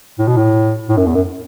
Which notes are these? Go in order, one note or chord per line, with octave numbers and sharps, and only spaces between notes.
A2
B2
A2
A2
F#2
E2
F#2